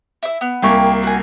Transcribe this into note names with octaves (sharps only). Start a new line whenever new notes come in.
E4 E5
B3
C2 A#3 G4 G#5 C#6
F#4 G#5